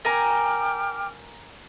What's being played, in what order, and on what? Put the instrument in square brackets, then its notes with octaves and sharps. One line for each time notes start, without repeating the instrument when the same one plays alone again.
[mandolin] A#4 G#5 A#5 [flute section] G5 D6 F6